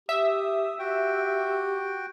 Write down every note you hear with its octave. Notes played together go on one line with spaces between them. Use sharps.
G4 E5 D#6
F#4 G4 G5